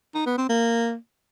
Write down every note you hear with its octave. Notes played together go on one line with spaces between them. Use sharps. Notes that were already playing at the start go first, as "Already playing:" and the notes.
D#4
B3
C4
A#3